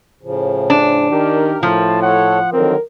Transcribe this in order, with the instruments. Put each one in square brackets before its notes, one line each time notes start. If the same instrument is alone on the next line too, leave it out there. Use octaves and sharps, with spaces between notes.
[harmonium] A2 C#3 F3
[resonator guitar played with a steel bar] D4
[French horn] D#3 [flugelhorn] G4 [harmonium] A#4
[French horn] A2 [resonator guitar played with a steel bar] F3 [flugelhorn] A5
[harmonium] A4 C#5 [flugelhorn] F#5
[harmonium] D3 D#3 F#3 [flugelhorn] C4 [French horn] A#4